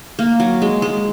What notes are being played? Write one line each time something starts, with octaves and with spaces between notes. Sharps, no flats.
A#3
F#3
G#3
G#3